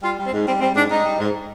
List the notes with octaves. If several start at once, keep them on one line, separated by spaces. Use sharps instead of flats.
G3 F4
G3
C4
G#2
G3 C4
G3 C4
G#2 D4
G#2 D#4
G3
G#2